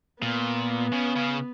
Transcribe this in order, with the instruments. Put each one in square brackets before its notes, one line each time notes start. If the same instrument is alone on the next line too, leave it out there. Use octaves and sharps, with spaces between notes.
[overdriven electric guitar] A#2 [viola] B3
[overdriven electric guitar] C#3
C#3